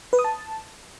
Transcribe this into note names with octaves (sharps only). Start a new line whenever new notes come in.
B4
D#6
A5